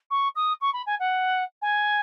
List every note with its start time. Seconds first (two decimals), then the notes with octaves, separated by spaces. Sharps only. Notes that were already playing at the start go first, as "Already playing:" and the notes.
0.10 C#6
0.35 D#6
0.61 C#6
0.73 B5
0.86 G#5
0.99 F#5
1.62 G#5